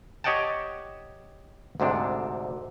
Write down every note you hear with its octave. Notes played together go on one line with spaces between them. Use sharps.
G4 C#5 D#5 F#5 G5 A5
D2 G#2 C3 D4